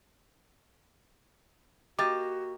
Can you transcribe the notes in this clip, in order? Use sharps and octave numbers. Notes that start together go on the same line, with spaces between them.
A#3 F#4 G4 D#5 D6 A6